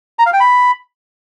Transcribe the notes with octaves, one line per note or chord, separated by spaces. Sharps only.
A#5
F5
G5
B5